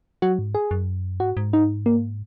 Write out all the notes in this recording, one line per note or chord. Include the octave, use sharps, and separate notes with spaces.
F#3 F#4
G#2
G#4
F#2
G#2 F#4
G#2
D#4
A#3